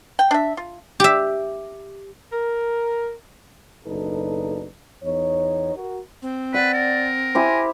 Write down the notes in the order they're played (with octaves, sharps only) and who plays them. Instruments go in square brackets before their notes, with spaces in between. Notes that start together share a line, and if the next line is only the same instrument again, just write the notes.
[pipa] G5
D4 E5
F4
[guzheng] G4 E5
[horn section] A#4
[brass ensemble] F#1 B1 D4 D#4 A4 B4
E2 B3 D#4 C#5
F#4 A#4
[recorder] C4
[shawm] B4 [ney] D5 [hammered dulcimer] F#5
[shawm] A#4
[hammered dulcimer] E4 G4 C5 [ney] G#5